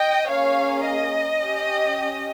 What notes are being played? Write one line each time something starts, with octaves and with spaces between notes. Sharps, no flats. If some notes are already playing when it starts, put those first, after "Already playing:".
Already playing: D#5 G5
A#3 C#4 G#4 C#5 F5
D#5
C#4 G4